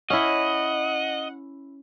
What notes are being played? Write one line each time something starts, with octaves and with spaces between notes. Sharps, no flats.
C#4 E4 D#5 F#5